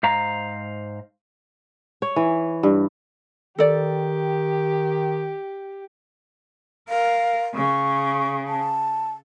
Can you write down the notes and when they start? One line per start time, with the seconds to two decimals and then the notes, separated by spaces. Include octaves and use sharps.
0.03 G#2 C5 F5 A#5
2.02 C#5
2.16 E3
2.63 G2
3.59 D#3 G4 A4 D5
6.89 A#4 F5
7.55 C#3 C#6
8.48 A5